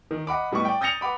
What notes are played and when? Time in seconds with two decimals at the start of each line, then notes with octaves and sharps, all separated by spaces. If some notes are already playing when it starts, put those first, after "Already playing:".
0.11 D#3
0.27 D#5 F#5 B5 D6
0.52 A2 G3 B3 D#5 C#6
0.65 D5 G5
0.81 D#6 G6 A6 A#6 C#7 F7
1.01 B4 F#5 B5 D6